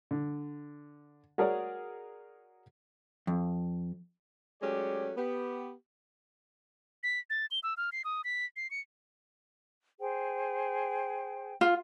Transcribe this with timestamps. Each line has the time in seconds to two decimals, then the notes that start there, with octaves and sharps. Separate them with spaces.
0.11 D3
1.38 F#4 G#4 A#4 C#5 D5
3.27 F2
4.62 F#3 G#3 A3 C#4 G4 D5
5.17 B3 G4
7.03 B6
7.30 A6
7.51 G7
7.63 E6
7.77 F6
7.92 C7
8.05 D#6
8.24 B6
8.56 C7
8.71 C#7
10.00 G#4 C5 G5
11.61 F4